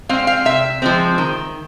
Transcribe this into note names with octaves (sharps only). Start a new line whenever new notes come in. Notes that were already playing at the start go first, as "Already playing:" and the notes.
G#3 C4 F5
F5
C3 E5
F3 G#3 C4
D#3